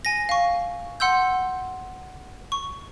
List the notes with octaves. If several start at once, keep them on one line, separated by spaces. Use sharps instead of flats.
G#5 A#6
F5 C#6
F#5 C6 E6 G6
C#6